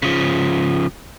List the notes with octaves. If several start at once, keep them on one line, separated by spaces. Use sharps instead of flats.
C#3 F3